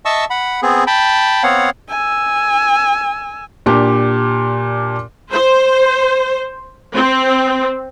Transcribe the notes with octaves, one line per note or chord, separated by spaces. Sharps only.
D#5 E5 A5 C#6 E6
F#5 B5
B3 C4 G#4
G5 A5 B5
B3 C4 C#5 F5 F#5
G#5 E6
A#2 D4 G4
C5
C4